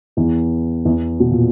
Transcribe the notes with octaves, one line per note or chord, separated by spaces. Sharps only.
E2 E3
E2 E3
B2
A#2